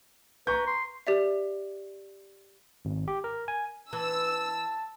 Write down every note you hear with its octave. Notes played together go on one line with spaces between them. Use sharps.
B4 A#5 C#6 G6
C6
G4 D5 E5
G#1
G4
A#4
G#5
E3 B4 A5 E6